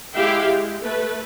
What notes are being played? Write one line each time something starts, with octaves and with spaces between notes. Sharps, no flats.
G#3 E4 G4 E5 F5 G5
G#3
A3 B4